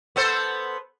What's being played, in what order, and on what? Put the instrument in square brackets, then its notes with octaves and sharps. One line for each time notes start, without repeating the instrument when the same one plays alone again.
[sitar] B3 A4 C5